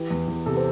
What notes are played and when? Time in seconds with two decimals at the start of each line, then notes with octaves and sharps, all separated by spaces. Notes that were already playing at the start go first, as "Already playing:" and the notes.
Already playing: E3 G4
0.10 E2
0.28 E2
0.46 C3 A4
0.57 C4